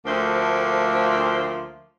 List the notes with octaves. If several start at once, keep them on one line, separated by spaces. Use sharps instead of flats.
D2 F3 A3 A#3 C5